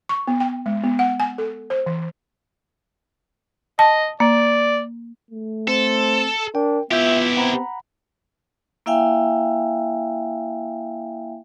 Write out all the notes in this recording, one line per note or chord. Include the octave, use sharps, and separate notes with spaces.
C#6
B3
G5
G#3
B3
F#5
G#5
A4
C5
E3
D#5 A5
A#3 D5
A3
C4 A4 C5
D4 A#4 G5
B3 E4 F4 G4 E5 G6
C4 F#5 A#5 B5
A#3 E4 E5 F5 G5 G#5